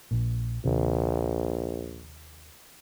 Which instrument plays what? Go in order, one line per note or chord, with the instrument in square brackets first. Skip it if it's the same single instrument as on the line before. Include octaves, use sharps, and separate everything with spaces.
[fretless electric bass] A#1 A#2
[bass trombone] A#1 [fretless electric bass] D#2 C3